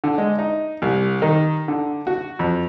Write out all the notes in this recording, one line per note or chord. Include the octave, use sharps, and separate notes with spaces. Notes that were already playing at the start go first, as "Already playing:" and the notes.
D3
G#3
D#4
C2
D#3
D3
F#4
F2